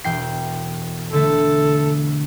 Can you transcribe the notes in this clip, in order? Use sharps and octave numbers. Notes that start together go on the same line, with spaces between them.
E1 G5 C7
D3 A3 A4